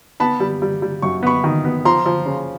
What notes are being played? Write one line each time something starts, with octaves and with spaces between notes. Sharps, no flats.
B3 A5 B5
G3
G3
G3
F#2 C#6
B3 B5 C#6
D#3
B3
F3 A#5 C6
F3
C#3